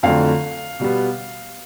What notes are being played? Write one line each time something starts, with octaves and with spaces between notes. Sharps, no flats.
F2 D3 F#3 A3 F5
B2 G3 B3